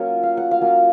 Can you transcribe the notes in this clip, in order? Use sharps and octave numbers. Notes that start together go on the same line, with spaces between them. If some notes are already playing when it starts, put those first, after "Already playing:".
Already playing: F#3 A#3 C#4 F4 C#5
F5
F#5
F5
F#3 A#3 C#4 F4